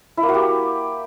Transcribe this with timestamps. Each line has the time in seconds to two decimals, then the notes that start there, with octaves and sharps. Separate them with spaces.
0.17 E4
0.23 A#3
0.29 F#4
0.34 G4